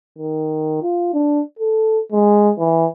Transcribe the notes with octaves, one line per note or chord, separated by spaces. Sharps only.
D#3
F4
D4
A4
G#3
E3